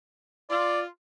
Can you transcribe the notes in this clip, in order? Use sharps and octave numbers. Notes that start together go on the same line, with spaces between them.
F4 D5